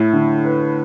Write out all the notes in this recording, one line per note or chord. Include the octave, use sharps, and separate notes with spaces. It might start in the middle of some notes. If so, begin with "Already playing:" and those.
Already playing: A2 E4
D3
B4